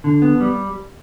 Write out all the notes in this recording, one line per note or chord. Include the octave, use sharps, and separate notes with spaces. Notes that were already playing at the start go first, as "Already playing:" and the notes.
D3
B3
G3